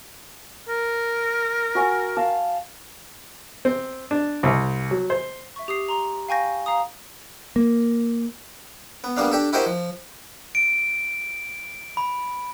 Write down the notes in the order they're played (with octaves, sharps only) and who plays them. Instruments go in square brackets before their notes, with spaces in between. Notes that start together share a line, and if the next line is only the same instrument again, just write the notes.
[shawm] A#4
[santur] F#4 G#5 C#6
F5 A5
[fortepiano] C4
D4
C2
F#3
C5
[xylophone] E5 C#6
G4 D#6 C7
A#5 C6
F5 G5 G#5 C#6 G6 A#6
F5 A#5 D#6
[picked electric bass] A#3
[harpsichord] B3
G3 A#3 B3 D4 F5
D4 G4 A4
E4 F#4 G4 A#4 C5 D#5
F3
[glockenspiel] D7
B5